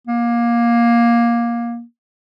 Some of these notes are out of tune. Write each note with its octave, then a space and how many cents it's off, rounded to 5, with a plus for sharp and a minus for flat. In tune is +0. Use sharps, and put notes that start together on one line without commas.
A#3 +15